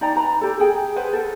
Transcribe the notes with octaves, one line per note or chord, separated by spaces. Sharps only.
D#4 D5 G5 A#5
B4 A#5 B5
G4 A4
G#4 G5
G#4 B4 C5 F#5
A4 A#4